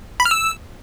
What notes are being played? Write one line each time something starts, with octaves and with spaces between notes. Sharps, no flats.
B5
F6
E6